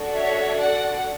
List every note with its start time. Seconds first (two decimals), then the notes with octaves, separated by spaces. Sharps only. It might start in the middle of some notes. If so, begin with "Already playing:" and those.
Already playing: D4 F#4 A4
0.14 C#5 E5
0.58 D5 F#5